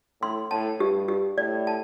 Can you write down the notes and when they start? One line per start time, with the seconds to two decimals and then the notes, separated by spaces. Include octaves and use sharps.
0.21 A2 C6
0.51 A2 A5
0.80 G2 G4
1.08 G4
1.37 A2 D5
1.67 A5